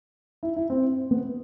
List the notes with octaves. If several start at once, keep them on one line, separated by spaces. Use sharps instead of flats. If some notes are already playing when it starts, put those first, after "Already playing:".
E4
E4
C4
B3